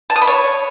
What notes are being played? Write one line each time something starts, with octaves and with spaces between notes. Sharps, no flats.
A5
D#6
B5
C#5